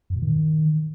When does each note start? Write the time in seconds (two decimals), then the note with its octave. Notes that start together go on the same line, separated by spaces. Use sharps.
0.10 F#2
0.16 A#2
0.22 D#3